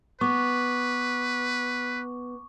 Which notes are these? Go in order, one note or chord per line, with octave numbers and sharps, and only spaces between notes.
B3 B4 C#6 D6